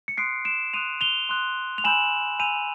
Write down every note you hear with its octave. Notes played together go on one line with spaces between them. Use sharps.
C#7
C6 D#6 F#6 C7 D7
D7 E7
C6 D#6 F#6 D#7 F7
F7 G7
C6 D#6 F#6
F7
G#5 B5 E6 G6 E7 F#7
G#5 B5 E6 G6 D#7 F7